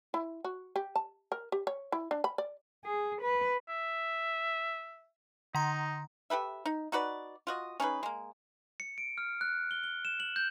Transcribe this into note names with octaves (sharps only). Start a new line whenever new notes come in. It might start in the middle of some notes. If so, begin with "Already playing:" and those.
E4
F#4
G4
A5
A#4
G4
C#5
E4
D4
B5
D5
G#4
B4
E5
D3 D#4 A#5
G4 A4 B4 E5
D#4
D#4 F#4 B4 D5
F4 F#4 D#5
C#4 D#4 G#4 B4
G#3 A#3
C#7
D7
F6
F#6
G7
G7
E7
F#7
G6